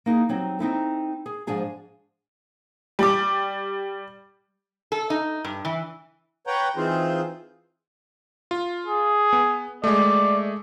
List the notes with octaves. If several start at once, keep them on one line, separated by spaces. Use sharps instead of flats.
A#3 D#4 E4 G#4
F#3 G3 C4 D#4
C4 D#4 E4 A4
G#4
G#2 F3 D4 G#4 A5
G3 D6
A4
D#4
G2
E3
B4 C#5 F#5 G5 A#5
E3 C4 D#4 F4 G#4 C5
F4
G#4
B3
G#3 A3 D5